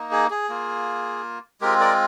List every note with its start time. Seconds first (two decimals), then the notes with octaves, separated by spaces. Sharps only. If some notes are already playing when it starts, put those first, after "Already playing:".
Already playing: A#3 D#4
0.12 G#4
0.30 G#4
0.49 A#3 F4
1.61 G#3 C4 F4 G4 A#4
1.80 A#4 D5